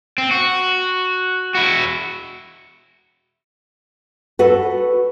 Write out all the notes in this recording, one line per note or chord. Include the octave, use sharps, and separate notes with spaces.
C4
F#4
E4 F#4
F#4 A4 B4